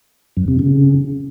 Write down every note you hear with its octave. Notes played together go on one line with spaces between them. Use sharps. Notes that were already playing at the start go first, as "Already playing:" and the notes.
F#2
C3
C#3